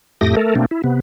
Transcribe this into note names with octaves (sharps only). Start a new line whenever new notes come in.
F2 A2 A3 G4 D#6 A#6
A3 A4 A#4
B2 A3 A#3 C4 D4
E4
C3 B3